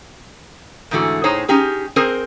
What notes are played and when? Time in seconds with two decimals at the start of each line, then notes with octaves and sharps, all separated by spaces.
0.91 G#2 D3 E3 A3 F#4
1.24 A2 D#4 G#4 C5 C#5
1.48 C#4 D#4 G4 G#4
1.96 C4 G#4 A#4 C5